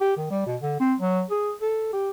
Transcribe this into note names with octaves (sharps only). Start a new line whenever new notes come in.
G4
D#3
G3
B2
D3
C4
F#3
G#4
A4
G4